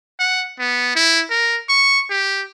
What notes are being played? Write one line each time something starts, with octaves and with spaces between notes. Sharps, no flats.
F#5
B3
E4
A#4
C#6
G4